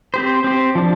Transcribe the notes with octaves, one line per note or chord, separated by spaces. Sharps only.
C4 G4 C5
C4 G4 C5
F3 D4